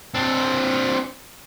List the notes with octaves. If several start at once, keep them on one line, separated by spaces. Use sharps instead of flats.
C4 D4